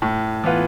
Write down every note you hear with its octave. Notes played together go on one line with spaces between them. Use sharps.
A2
E3 B3 F4 B4